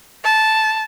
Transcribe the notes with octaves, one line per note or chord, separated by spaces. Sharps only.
A5